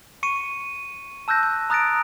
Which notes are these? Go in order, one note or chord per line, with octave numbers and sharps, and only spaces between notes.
C#6 C#7 D#7
A5 E6 F#6 G6 A#6
G6
A#5 D#6 F#6 A6 A#6 D7